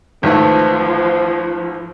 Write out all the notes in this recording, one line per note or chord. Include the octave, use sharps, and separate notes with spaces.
G#1 E3 F3 A3